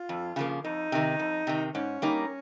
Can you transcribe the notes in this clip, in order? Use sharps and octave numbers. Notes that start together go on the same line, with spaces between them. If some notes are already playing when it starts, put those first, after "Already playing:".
Already playing: F4
F2
C#3 F3 A#3
F2 D#4
C3 D#3
F2
C3 D#3
G#2 C#4
G3 A#3 D#4